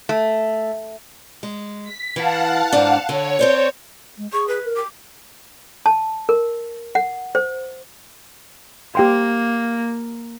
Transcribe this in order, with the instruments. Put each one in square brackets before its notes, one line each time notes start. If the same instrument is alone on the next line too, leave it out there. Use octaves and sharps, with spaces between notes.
[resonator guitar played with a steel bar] A3
[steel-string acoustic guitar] G#3
[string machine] B6
[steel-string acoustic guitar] E3 [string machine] F5 F#5 A5
[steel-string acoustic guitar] G#2 D4
[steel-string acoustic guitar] D3 [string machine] C#5
[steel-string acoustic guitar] C4 C5 D5
[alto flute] G#3
[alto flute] G#4 [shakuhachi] C#6
[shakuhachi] B4
[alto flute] A#4
[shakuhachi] D6
[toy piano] A5
A#4
F#5
C5
[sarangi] A#3 [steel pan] G4 G5 C6